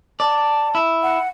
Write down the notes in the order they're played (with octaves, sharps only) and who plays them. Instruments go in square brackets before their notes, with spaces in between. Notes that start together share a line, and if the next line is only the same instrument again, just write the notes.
[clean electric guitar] D5 [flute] A5
[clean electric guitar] E4
[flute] F#5